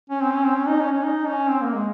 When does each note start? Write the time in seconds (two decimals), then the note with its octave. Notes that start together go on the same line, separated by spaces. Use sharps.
0.10 C#4
0.21 C4
0.33 C#4
0.45 C4
0.56 C#4
0.68 D#4
0.80 C#4
0.92 C#4
1.03 D#4
1.26 C#4
1.49 C4
1.61 A#3
1.73 G#3